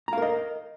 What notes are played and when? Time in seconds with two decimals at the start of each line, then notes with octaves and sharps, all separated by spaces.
0.08 A#5
0.13 F5
0.18 A#4
0.22 D#5